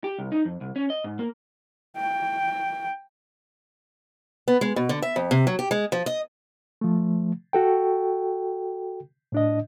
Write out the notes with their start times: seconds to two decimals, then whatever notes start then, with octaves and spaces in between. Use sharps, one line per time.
0.04 G4
0.19 C2
0.32 D#4
0.45 F2
0.61 C2
0.76 C#4
0.90 D#5
1.04 G#2
1.19 A#3
1.97 G5
4.48 B3
4.61 G#3
4.76 B2
4.89 D3
5.02 E5
5.16 F2
5.31 C3
5.47 F#3
5.59 G4
5.71 G#3
5.92 F3
6.06 D#5
6.81 F3 A3
7.53 F#4 A4 G5
9.32 A2 D4 D#5